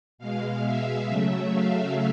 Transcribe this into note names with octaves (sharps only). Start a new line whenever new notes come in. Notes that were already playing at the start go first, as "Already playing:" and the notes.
B2 G#3 F5
E5
C#3 F#3 A3
F5